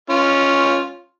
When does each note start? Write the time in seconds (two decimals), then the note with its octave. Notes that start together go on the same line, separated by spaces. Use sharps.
0.10 C#4 F4